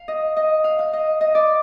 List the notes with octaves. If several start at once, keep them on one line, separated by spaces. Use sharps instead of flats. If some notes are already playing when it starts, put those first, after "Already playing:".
Already playing: F5
D#5
D#5
F5
F5
D#5
D#5
D5